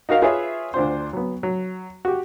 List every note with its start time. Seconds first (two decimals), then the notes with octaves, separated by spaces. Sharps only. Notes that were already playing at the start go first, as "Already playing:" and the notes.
0.09 D#4 F#4 A#4 F5
0.22 F4 G#4 B4 C#5 E5
0.74 D2 D4 F4 C5
1.13 F#3 B3
1.43 F#3
2.05 F#4 G4